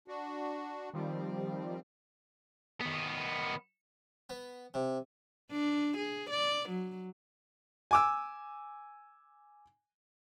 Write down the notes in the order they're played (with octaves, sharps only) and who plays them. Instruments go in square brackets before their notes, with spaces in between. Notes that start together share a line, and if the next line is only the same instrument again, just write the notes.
[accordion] D4 F#4
[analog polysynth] D#3 F3 G3 [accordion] C4
[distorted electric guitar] D#3 B3
[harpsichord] B3
C3
[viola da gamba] D4
G#4
D5
F#3
[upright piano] G#5 D6 E6